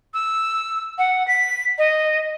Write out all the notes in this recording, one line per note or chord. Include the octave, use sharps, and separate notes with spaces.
E6
F#5
B6
D#5